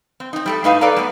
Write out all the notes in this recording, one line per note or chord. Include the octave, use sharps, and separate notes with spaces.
C4
C4 D#4
G3 A3 A4
A2 A3 D#4 B4 E5 F5
A4 B4 D5 F5 A#5
G3 A3 B3